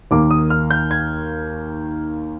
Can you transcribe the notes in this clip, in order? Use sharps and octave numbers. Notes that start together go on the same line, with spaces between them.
D#2 D#3 A#3 D6
D#6
F6
G6
G#6